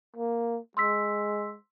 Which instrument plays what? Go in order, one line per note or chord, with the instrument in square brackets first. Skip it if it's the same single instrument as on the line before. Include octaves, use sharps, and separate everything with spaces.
[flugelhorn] A#3
[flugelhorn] G#3 [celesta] C6 E6 B6